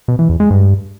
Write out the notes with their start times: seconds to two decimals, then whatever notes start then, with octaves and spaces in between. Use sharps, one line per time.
0.08 B2
0.19 E3
0.29 E2
0.40 G#3
0.50 G2